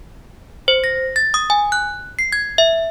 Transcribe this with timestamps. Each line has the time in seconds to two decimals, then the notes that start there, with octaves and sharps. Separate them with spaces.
0.68 C5
0.84 A#6
1.16 A6
1.34 D#6
1.50 G#5
1.72 F#6
2.19 C7
2.32 G#6
2.58 E5